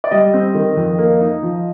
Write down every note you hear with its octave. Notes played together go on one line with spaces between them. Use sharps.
D5
G3 D#5
C4
D#3
F2
A#3
D#4
F3